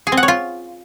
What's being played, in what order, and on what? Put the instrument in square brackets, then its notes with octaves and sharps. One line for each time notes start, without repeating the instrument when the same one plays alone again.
[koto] G#4
C4
F#5
C#5
F4